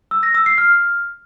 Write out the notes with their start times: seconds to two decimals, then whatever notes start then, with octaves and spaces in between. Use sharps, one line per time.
0.11 E6
0.23 A#6
0.35 E6
0.46 C7
0.58 F6